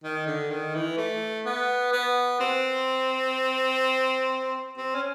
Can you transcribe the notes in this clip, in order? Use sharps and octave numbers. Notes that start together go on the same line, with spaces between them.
D#3
D3
D#3
E3
A3
B3
B3
C4
C4
C#4